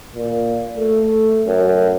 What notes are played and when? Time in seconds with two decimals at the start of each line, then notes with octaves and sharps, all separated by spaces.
0.15 A#2
0.78 A3
1.47 F#2